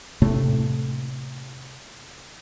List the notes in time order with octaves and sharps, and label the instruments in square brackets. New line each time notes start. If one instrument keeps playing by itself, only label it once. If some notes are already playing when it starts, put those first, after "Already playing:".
[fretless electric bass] A2 C3 A3